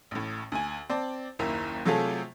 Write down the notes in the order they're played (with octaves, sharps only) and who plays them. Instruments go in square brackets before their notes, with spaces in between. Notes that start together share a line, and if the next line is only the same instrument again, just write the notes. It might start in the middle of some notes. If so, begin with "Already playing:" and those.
[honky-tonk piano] A1 A2
D2 G#5
C4 D5 A5
F#1 D#2 E4 A#4 A#5
C3 F#3 A3 F4 G#4 A4